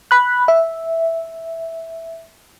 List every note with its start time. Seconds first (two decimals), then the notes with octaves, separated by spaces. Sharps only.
0.11 B5 F#6
0.48 E5